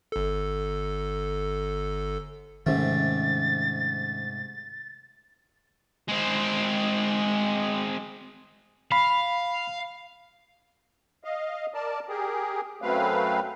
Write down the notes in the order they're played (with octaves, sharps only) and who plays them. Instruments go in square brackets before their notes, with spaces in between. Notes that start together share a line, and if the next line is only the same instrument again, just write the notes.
[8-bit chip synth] G1 A4
[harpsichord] G#2 C3 A3 [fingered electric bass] D#3 C4 C#4 [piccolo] A6
[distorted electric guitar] G#3 C4
[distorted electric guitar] F5 [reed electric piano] B5
[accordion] D#5 F5
A#4 D5 A5
G4 G#4 A#4
F#2 F#3 A3 C4 B4 F5